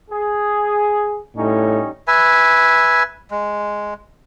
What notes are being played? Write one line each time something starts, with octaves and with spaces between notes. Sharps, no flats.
G#4
A2 G3 C#4 D#4
B4 E5 G#5
G#3